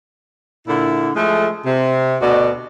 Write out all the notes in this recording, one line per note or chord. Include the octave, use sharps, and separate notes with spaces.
A#2 D3 E4
F3 G#3 A3
C3
D2 B2 F#4 D5 D#5